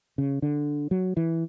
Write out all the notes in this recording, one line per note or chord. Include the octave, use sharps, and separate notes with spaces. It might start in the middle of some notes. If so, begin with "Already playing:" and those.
C#3
D3
F#3
E3